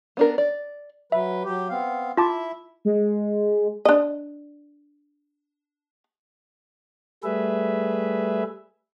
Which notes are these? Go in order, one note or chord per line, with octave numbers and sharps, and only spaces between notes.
B3 D4 A#4
D5
F#3 B4 E5
F#3 G4
B3 C4 F5
E4 F4 E5 A5 D6
G#3
D4 D#5
G3 A3 G#4 B4 E5